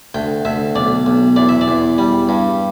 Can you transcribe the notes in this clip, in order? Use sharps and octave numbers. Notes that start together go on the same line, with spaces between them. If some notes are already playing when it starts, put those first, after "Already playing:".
D2 G5
D2 E5
B1 D5
B1
E2 D5
E5
D5
E2
G3
G2